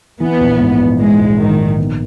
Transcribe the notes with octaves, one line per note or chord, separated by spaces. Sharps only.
E3 B3
A#1
G#2
A#1
E3 G#3
A#1
G#2 D#3
A#1
B3